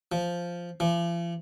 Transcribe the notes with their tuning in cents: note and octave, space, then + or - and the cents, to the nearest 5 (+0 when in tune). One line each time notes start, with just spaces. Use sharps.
F3 -5
F3 -45